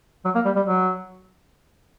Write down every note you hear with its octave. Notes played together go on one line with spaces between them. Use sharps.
F#3
A#3
G3
G3
F#3